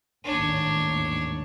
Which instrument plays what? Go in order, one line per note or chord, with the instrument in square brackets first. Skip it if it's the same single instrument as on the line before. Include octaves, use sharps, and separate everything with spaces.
[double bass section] A1 D#2 G#2 [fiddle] D4 C#5